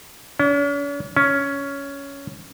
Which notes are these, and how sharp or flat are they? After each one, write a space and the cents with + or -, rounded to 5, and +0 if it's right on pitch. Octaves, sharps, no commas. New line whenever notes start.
C#4 +45
C#4 +10